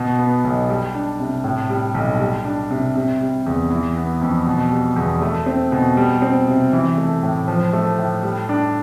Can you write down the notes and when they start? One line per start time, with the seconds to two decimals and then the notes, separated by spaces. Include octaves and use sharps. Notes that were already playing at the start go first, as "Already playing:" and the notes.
Already playing: B2
0.19 B3
0.44 B1
0.70 G3
0.95 D4
1.20 C3
1.44 A2
1.69 G3
1.94 B1
2.20 G3
2.45 D4
2.70 C3
2.95 C3
3.21 G3
3.46 E2
3.70 E3
3.96 B3
4.21 F2
4.47 B2
4.72 G3
4.96 E2
5.22 A3
5.46 C4
5.72 B2
5.97 G3
6.22 C4
6.48 C3
6.73 E3
6.98 A3
7.23 A2
7.48 F3
7.73 A3
7.98 A2
8.23 G3
8.49 D4